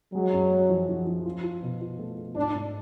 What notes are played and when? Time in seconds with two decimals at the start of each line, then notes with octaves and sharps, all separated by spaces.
0.14 F#3 G#3
0.33 F#2
0.51 G#3
0.69 F3
0.89 F3
1.07 F3
1.25 F4
1.43 F4
1.62 B2
1.81 F4
1.99 A3
2.18 A3
2.36 G#2 D4
2.55 G#2